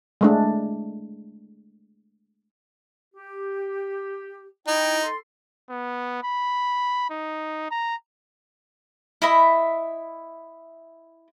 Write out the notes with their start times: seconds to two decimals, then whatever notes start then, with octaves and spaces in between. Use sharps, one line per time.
0.21 G#3 A3 D4
3.15 G4
4.68 D#4 E4 G5
5.03 A4 C6
5.69 B3
6.23 B5
7.10 D#4
7.70 A#5
9.22 E4 D#5 E5 B5